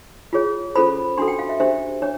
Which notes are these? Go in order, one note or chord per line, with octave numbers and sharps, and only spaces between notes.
F4 G#4 C#5
C#4 F4 A4 C5 B5
D4 F#4 A4 C6
G5
F5
E5
D4 G4 C5 E5
D4 C#5